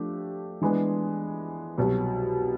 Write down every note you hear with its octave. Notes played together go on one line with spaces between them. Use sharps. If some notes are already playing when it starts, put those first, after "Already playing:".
Already playing: F3 A3 D4 G4
E3 G#3 B3 D4
C2 B2 F#3